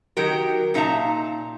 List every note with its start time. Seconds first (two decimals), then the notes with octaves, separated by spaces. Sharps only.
0.17 D#3 F#3 G4 A#4
0.74 A#2 D#4 E5 F5 A5 A#5